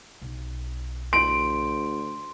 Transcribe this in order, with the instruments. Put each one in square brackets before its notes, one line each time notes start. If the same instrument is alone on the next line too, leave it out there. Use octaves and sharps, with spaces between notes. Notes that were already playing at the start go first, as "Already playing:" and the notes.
[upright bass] B1
[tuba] D2 [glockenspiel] C6 [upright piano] D7